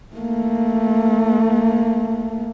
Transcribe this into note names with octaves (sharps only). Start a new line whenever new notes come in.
A3 A#3